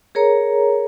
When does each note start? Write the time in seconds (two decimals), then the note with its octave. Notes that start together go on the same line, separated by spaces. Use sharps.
0.15 G#4 A#4 C#5 A#5